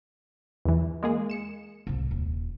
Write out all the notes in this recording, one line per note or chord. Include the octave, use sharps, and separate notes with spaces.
E2 E3
G#3 A#3 G#4
C#7 E7
C2 G#2
D#1